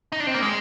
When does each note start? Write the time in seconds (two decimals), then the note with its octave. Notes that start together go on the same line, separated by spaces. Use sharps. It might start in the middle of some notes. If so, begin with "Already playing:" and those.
0.12 D#4
0.20 D4
0.27 C4
0.35 A#3
0.42 G#3